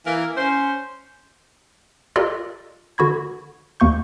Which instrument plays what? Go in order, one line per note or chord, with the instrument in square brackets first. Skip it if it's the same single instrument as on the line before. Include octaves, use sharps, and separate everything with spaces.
[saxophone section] E3 A#3 A#4
C#4 C5
[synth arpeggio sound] F4 G4 A4 A#4 D5 D#5
D3 F#4 B5 G#6
D#2 A#3 C#6 G6